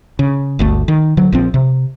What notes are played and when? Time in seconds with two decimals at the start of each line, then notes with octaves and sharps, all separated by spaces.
0.19 C#3
0.59 G1 D2 A3
0.88 D#3
1.17 D3 F#3
1.32 A#1 F3 C4
1.54 C3